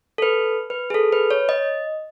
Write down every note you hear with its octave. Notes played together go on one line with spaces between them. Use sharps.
A4
B4
B4
G#4
A4
B4
C#5
D#5